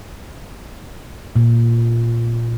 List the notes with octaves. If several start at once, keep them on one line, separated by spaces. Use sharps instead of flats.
A#2